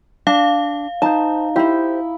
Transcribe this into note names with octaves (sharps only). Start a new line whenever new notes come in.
D4 F5 A5
D#4 C5 A5
E4 G4 C5